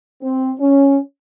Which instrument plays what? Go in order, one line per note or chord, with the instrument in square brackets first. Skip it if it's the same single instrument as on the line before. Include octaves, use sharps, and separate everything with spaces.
[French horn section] C4
C#4